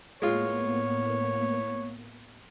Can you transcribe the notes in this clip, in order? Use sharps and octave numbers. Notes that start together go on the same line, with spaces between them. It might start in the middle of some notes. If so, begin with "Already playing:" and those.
A2 G#3 A#3 B3 F4 C#5